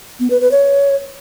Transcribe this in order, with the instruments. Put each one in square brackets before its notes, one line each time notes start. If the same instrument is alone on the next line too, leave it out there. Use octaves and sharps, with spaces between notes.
[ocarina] B3
B4
B4
C#5